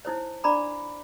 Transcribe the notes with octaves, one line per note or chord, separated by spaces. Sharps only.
D#4 E4 C5 C#5
D4 D5 A#5 B5 D6